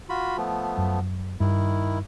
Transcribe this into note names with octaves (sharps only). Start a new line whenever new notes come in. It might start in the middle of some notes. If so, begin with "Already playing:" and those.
F4 F#4 B5
F3 A3 B3
F#2
G2 D#3 E4